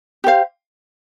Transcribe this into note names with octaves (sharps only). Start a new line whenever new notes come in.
G4 C5 F5